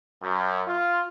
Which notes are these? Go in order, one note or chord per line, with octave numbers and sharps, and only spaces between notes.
F#2
F4